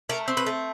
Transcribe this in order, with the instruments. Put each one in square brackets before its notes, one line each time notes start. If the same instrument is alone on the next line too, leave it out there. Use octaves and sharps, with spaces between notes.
[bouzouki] A3 A#4
C4
B4
A3